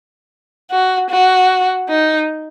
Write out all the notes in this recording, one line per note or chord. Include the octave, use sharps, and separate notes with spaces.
F#4
F#4
D#4